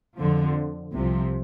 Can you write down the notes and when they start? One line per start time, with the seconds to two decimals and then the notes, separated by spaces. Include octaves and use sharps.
0.17 F2 D3 F3
0.92 C2 C3 F3